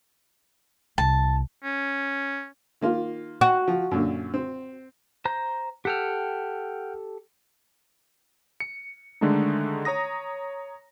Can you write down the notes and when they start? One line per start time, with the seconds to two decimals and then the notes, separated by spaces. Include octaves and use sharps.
0.98 C2 A5
1.64 C#4
2.81 D#3 A#3 F4
3.41 F#4
3.68 F3
3.91 F#2 A#2 D3
4.34 C4
5.25 C5 A#5 G6
5.85 G4 A4 F#5 G5 F6
8.60 C#7
9.21 D3 D#3 G#3 A3 D4 D#4
9.85 C#5 A#5 D#6 A#6